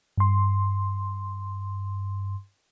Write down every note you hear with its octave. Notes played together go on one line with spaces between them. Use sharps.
G2 C6